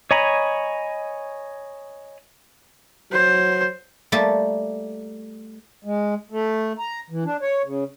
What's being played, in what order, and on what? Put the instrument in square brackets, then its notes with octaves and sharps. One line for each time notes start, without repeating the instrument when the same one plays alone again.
[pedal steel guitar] C#5 D#5 G#5 A#5 B5
[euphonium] F#3 [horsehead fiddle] C5
[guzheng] G3 A3 A#3 G4 A4
[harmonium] G#3
A3
A#5
E3
D4
C#5
C#3